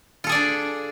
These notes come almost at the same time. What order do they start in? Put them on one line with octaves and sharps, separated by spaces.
F4 A4 G#4 D5 D4